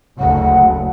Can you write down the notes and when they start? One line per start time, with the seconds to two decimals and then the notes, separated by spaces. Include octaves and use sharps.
0.19 F#1 D2 C#3 F#5